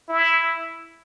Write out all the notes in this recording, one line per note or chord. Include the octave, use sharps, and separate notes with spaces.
E4